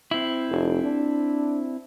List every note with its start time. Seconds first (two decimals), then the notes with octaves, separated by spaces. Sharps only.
0.11 C4 E4
0.50 F1
0.84 D4